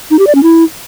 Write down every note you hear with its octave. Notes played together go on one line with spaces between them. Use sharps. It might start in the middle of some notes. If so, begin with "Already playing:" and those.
D#4
G4
D5
C#4
E4